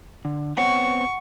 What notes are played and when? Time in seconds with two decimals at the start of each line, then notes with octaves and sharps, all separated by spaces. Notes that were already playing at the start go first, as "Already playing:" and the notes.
0.25 D3
0.57 B3 C4 C#5 F#5 C#6